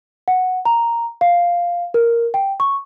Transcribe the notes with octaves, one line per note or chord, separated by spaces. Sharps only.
F#5
A#5
F5
A#4
G5
C#6